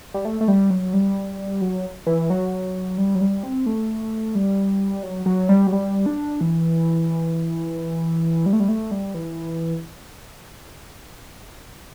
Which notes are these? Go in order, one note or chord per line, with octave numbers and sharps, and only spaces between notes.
G3
A3
A3
G3
F#3
G3
F#3
E3
F#3
G3
F#3
G3
C4
A3
G3
F#3
F#3
G3
F#3
G3
D4
E3
G3
A3
G3
A3
G3
E3